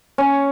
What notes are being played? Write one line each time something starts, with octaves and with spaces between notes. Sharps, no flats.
C#4